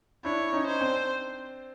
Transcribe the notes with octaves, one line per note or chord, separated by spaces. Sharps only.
D4 E4 C#5
C#4 D#4
C5
C4 D4